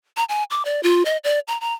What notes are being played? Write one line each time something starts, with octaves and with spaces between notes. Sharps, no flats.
A#5
G#5
D6
D5
F4
D#5
D5
A#5
A#5